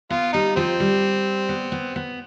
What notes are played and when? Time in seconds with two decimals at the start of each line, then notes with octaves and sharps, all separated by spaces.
0.10 B3 F4
0.33 G3 D#4
0.56 F3 C4
0.80 G3
1.49 B3
1.72 B3
1.96 B3